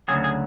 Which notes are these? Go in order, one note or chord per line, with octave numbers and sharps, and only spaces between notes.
D2 C#3 F#3 G#4
G#4